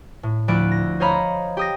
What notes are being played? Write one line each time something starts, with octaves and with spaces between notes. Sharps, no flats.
A2
D2 F3 E4 D5 F#6 D7
A#6
C5 C#5 D#5 F5 A#5 B5
G4 D#6 A#6